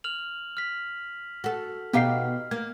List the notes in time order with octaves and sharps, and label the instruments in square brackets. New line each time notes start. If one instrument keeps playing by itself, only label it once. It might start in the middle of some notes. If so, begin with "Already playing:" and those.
[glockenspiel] F6 F7 F#7
F6 B6
[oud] F#4 A4
[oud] B2 D#4 G4 [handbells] B3 F5 C7 [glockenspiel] F6
[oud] A#3 [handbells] G#6